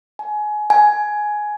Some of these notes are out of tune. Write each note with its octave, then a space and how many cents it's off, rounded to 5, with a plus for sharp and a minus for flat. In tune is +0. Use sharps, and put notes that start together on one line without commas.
G#5 +25
G#5 +10